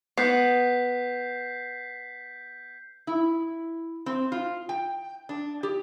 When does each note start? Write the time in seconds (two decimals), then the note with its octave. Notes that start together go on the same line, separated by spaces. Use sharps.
0.18 B3 G6 B6 C7
3.07 E4
4.06 C4
4.32 F4
4.69 G5
5.29 D4
5.63 G4